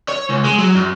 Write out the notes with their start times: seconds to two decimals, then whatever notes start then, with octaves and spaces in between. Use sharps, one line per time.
0.09 C#5
0.30 C#2
0.45 G#3
0.59 F#3
0.75 F#2